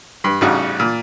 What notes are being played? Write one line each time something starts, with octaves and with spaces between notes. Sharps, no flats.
G2
A1 C#3 G3 D#4 F#4 F#5
A#2